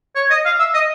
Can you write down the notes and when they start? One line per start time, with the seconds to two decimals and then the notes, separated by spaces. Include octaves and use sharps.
0.16 C#5
0.31 D#5
0.45 F5
0.59 E5
0.74 D#5